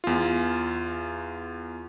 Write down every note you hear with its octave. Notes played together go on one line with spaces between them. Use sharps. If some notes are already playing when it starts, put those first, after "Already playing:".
E2 F4